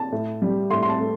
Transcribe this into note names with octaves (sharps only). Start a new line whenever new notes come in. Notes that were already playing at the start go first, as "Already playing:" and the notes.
Already playing: A5
A2
G3
A2 C6
C6
A5
A3